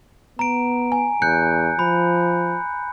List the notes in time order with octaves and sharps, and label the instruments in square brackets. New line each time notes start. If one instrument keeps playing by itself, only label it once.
[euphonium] B3 [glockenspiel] A#5 D7
[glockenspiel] G#5
[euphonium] E2 [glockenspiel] F#6 G6 C#7
[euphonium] F3 [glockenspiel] B5